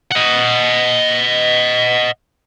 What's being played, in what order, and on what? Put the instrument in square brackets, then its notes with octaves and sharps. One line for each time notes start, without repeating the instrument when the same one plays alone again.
[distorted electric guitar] D#5 F#5